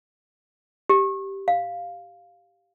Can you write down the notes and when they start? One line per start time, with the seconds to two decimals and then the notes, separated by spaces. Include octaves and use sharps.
0.89 G4
1.48 F5